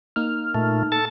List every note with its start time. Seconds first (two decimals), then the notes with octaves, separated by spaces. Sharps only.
0.16 A#3 D#4 F6
0.55 A#2 A3
0.92 A4 A5